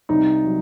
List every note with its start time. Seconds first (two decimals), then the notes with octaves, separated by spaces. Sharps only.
0.09 C2 D#4
0.44 F#3